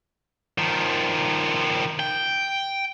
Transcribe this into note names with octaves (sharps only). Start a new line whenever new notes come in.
D#3 F3
G5